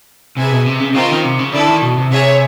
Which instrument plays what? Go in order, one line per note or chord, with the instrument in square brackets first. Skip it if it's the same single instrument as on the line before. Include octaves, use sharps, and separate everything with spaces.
[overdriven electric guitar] C3 [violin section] G#4 B4 E5 G#5
[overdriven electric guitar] B2
C3
C#3
C3
[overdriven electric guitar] C#3 [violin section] C4 F4 A#4 D#5 G5
[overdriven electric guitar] D#3
C3
C#3
[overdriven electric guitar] D3 [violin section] E4 A4 D5
[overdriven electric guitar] D#3
B2
C3
[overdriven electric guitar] C3 [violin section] G#4 C#5 E5